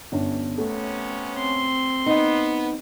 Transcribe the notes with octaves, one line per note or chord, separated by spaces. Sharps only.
G1 C#4 D4
C3 A3 B3 C#4
C4 C6
B3 D#4